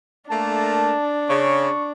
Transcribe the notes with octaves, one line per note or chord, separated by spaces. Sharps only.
A3 A#3 D4 A5
C#3 C#6